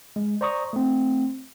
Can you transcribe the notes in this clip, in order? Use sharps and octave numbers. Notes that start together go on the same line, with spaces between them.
G#3
C5 D5 A#5 C#6 D#6
A3 C4